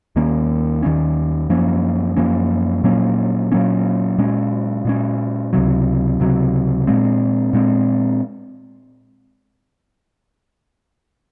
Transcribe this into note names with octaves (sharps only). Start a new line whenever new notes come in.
D#2 D#3 A#3 C#4
D#2 D#3 A#3 C#4
F#2 F3 A#3 C#4
F#2 F3 A#3 C#4
A#2 F#3 A#3 C#4
A#2 F#3 A#3 C#4
A#2 G#3 C#4
A#2 G#3 C#4
C#2 C3 F#3
C#2 C3 F#3
A#2 G#3 C4
A#2 G#3 C4